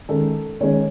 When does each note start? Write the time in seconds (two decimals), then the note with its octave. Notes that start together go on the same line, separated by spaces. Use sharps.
0.09 D#3 G#3 C#4 A4
0.61 D#3 G#3 C#4 C#5